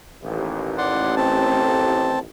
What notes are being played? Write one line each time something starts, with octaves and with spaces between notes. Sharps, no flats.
A1 D#2
D5 F#5 C6
C4 A5